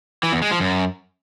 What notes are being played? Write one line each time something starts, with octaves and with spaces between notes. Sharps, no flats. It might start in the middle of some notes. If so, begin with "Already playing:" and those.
E3
E2
G#3
F3
F#2